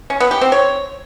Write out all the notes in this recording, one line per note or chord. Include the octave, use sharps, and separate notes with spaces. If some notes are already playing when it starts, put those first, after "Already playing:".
C#4
B3
G4
C4
C#5